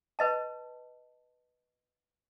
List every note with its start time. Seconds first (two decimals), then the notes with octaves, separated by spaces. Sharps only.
0.19 B4 D#5 A5